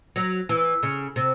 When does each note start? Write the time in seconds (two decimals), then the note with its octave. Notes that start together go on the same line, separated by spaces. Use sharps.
0.16 F#3
0.49 E3
0.83 C#3
1.16 C3